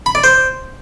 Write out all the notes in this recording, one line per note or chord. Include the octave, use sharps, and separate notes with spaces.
B5
D5
C5